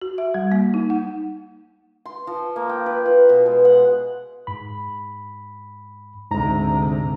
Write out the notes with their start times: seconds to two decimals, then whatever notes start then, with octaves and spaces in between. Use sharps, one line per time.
0.02 F#4
0.18 E5
0.34 G3
0.52 A#3
0.74 D#4
0.90 F#5
2.06 C6
2.27 F3
2.56 A#3
2.69 G5
2.86 B4
3.06 F4
3.29 B2
3.46 G#3
3.65 F#5
4.47 G#2 B5
6.31 D2 G#2 C3 A#5